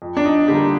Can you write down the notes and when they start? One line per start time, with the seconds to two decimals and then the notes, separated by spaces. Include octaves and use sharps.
0.02 F2
0.17 D4
0.25 D#4
0.48 D3 G3 A#3 G4